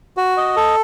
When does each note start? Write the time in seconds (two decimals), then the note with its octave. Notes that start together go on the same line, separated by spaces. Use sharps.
0.17 F#4
0.37 D#5
0.56 A4